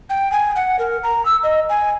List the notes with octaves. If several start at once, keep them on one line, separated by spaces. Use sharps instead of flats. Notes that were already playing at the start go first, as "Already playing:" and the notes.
G5
G#5
F#5
A#4
A#5
E6
D#5
G#5